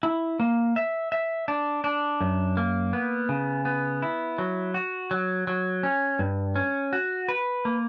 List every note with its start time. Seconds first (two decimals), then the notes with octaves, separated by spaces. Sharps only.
0.03 E4
0.40 A#3
0.76 E5
1.12 E5
1.48 D4
1.84 D4
2.21 F#2
2.57 A#3
2.93 B3
3.29 C#3
3.65 B3
4.02 E4
4.38 F#3
4.74 F#4
5.11 F#3
5.47 F#3
5.83 C#4
6.19 G2
6.56 C#4
6.93 F#4
7.29 B4
7.65 A#3